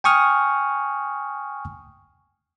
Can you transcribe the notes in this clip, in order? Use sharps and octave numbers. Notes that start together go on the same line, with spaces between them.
G5 G#5 C#6 D#6 F6